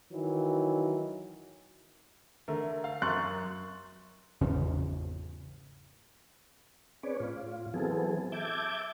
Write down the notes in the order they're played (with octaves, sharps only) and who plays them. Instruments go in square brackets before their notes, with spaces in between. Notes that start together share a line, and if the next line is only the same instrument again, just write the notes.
[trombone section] D#3 E3 F#3
[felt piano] D3 A3 A#4
F5
F#2 A#4 C6 C#6 F#6 A6
[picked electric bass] G#1 E2 C#3 C#4
[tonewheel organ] C4 C#4 G#4 B4 C#5 D5
A2 F4
E3 F#3 B3 C4 G#4 A4
E5 A5 D6 G6 G#6